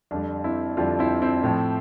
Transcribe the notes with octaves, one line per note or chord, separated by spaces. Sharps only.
F2 D3 G3 D4
C4 E4
F2 D3 G3 D4 F4
C4 E4
C4 E4
A2 F3